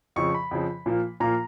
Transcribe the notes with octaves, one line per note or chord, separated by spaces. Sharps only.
F2 C#3 F3 C#6
B5
F2 C#3 F3
A#2 F3 A#3
A#2 F3 A#3 A#5